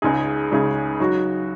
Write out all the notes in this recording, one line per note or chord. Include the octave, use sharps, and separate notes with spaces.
C#2 C#3 G#3 D#4 G#4
C#2 C#3 G#3 D#4 G#4
F#3 D#4 F#4